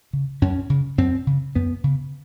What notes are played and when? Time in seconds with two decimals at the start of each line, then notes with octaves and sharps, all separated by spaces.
0.13 C#3
0.42 F#2 C#4
0.70 C#3
0.98 F#2 C4
1.27 C#3
1.55 F#2 B3
1.84 C#3